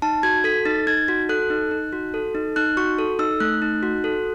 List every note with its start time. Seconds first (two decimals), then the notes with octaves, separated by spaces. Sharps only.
0.02 D#4 A5
0.23 F#4 G#6
0.44 A4 B6
0.65 D#4 A6
0.87 D#4 G#6
1.08 F#4
1.29 A4 F#6
1.50 D#4
1.71 D#4
1.93 F#4
2.14 A4
2.35 D#4
2.56 D#4 F#6
2.77 F#4 C#6
2.99 A4
3.19 D#4 E6
3.40 A3 F#6
3.62 D#4
3.83 F#4
4.04 A4